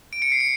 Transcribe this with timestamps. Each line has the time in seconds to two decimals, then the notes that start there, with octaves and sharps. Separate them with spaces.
0.13 D7
0.22 C#7
0.32 C7
0.40 C#7